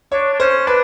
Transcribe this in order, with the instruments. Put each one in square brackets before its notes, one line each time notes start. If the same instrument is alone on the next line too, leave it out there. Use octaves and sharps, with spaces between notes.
[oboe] D4 [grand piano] C#5
[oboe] D4
[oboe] C#4 [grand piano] C5
[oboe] D4 [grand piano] B4